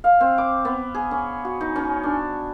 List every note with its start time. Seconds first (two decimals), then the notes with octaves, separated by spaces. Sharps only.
0.04 F5
0.20 C4
0.38 D6
0.65 B3
0.95 G#4
1.11 C#4
1.45 F#4
1.61 D#4
1.76 C#4
2.03 D4